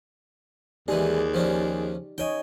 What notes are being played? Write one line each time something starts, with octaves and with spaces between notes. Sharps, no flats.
D#2 E3 G#3 D4 D#4 G4 G#4 D5
F3 C#4 D4
D#4 C#5 D#5 G5 G#5